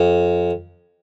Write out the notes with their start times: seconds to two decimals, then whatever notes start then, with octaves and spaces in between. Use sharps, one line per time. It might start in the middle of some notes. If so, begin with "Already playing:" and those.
Already playing: F2